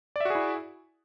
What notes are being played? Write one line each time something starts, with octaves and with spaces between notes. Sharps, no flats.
E4 F#4 G#4 D5 E5